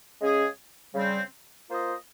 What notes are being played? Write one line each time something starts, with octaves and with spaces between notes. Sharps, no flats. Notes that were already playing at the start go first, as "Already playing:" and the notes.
C#3 G#3 C#4 G#4
C#3 G3 C4
A#3 F4 C5 D#5